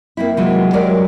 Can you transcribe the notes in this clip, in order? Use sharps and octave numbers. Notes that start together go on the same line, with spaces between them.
A#3 C4 E4
C3 E3 F#3 G#3 A#3 F4
F#3 G#3 G4 A#4 D5